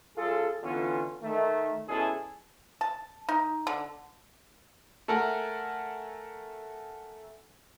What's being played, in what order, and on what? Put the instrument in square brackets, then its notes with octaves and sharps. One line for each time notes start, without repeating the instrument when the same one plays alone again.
[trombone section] F#2 F4 G#4 A4
D3 E3 B3 C#4 F4
D#3 A3
B2 G#3 C#4 E4 G#4 A4
[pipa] A5
D#4
D3
[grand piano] A3 A4 A#4 F#5 G#5